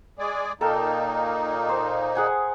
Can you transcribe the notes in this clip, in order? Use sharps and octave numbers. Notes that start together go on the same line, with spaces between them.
G#3 G#4 D5
A#2 A#3 D#4 A4 A#4 G5
C5
G#4 F#5 G#5